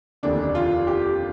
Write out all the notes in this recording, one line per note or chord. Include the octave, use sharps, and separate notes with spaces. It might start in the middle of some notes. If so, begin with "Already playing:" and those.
F1 D#2 D3 D4
F4
G4